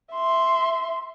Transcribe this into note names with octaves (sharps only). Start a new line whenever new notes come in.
E5 C6